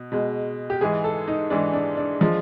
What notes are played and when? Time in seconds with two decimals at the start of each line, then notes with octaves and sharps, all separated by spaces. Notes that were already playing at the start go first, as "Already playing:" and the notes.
Already playing: B2
0.12 B2 G#3
0.70 G4
0.81 G#2 E3 G#3 G#4
1.04 A4
1.28 D#4
1.50 G#2 E3 G#3 D4
1.73 D4
1.97 D4
2.21 F3 G#3